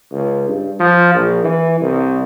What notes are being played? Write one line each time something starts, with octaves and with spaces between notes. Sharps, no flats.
C#2
G2
F3
A#1
E3
C2